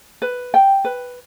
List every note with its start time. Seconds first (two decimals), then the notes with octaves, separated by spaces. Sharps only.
0.22 B4
0.54 G5
0.84 B4